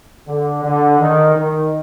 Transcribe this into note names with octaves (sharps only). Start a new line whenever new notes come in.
D3
D3
D#3
D#3